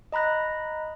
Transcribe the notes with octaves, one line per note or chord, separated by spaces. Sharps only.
D#5 A#5 B5 F#6 A#6